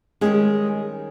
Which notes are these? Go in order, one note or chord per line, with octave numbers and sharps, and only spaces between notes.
D#3 G3 G#3 C#4 G#4